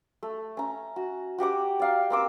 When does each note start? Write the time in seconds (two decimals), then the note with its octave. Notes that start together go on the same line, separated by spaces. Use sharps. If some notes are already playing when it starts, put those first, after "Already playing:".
0.23 A3
0.57 C#4 A#5
0.96 F#4
1.38 F#4 G4 F#5 D6
1.80 D5 F5 A#5
2.10 A#3 C4 D6 E6